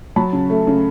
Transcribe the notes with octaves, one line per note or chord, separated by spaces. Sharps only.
F#3 A5 B5
C#3
A3
C#3